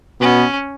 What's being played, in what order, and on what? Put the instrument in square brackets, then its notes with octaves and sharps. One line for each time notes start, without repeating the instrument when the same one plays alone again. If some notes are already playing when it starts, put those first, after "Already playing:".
[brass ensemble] B2 B3 [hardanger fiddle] C#4